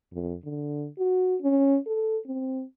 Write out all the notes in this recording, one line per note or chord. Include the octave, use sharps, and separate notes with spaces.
F2
D3
F#4
C#4
A4
C4